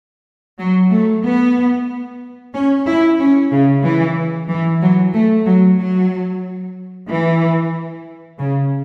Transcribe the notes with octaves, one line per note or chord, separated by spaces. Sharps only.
F#3
A3
B3
C#4
E4
C#4
C#3
E3
E3
F#3
A3
F#3
F#3
E3
C#3